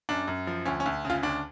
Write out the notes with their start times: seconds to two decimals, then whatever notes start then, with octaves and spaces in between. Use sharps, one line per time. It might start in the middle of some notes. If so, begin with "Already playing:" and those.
0.09 F#2 D4
0.28 F#2
0.47 F3
0.65 D2 C#4
0.80 C#4
0.86 D2
1.05 C#3 F4
1.23 D2 D4